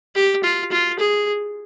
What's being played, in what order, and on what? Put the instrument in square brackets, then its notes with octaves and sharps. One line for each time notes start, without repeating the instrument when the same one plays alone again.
[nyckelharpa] G4
F4
F4
G#4